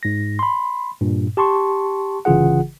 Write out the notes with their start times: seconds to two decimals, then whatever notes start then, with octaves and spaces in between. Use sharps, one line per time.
0.03 G#2 A#6
0.39 B5 C6
1.01 G2 A#2
1.37 G4 A5 C6 C#6
2.25 G1 C#3 E3 F4 G#4 F#5